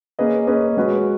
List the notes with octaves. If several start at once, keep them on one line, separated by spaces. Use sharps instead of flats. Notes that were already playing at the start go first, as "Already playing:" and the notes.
A#3 C#4 G#4 B4 D#5
A#3 C#4 G#4 B4 D#5
G#3 C#4 F#4 B4